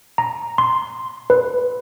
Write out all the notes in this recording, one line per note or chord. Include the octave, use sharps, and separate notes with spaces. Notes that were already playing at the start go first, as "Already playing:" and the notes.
A#5
C6
B4